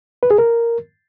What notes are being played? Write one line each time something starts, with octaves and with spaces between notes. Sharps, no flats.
B4
G#4
A#4